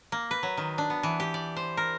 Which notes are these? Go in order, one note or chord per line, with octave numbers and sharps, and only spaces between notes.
A#3
B4
F#3
D#3
D4
B3
E3
G4
D5
C5
A#4